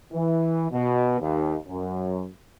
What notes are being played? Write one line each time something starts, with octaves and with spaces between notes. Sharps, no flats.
E3
B2
D#2
F#2